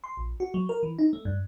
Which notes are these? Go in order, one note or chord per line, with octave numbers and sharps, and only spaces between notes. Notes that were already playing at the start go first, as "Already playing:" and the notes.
C6
A#1
F#4
F#3
A#4
E3
D#4
A3
G2